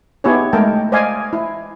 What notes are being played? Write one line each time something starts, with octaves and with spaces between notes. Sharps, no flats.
B3 D#4 E4 G4 G#4 C#5
G#3 A3 A#4 G5 A5
C5 D5 D#5 F5 G#5
E4